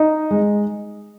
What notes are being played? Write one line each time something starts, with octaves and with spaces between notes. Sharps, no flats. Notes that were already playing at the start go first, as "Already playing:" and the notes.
Already playing: D#4 D#5
G#3